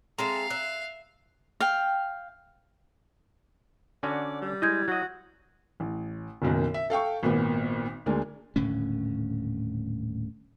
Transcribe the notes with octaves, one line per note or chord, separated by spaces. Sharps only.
G#3 C4 A4 E5 F5 A#5
E5 F#6
F5 G5
D3 C#4 F#4 D5
G3
G#3 E4 D#5 G6 G#6
F#3 F#4 D#5
A1
F#1 B1 F#2 D#3
E5
A4 F5 G5 C#6
G#1 A#2 B3
D2 G#3 A#3 D4
D#1 A2 D3 C#4